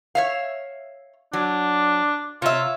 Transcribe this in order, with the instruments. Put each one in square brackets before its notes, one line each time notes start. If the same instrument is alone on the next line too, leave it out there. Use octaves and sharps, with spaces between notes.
[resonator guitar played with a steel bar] C#5 E5 F5
[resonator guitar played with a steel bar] F#3 [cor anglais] D4
[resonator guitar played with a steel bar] C3 [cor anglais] F4 [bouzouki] C#5 E5